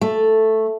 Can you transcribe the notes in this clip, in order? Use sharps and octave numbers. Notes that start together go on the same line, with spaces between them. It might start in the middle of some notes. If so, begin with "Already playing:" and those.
A3